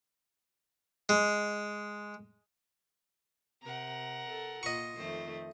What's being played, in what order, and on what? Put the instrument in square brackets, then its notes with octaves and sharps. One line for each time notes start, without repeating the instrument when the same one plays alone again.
[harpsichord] G#3
[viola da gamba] C3 [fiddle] A#4 F#5
[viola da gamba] A4
[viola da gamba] A#2 F4 [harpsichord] D#5 C#6
[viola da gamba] F2 D#3 A3 [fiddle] C5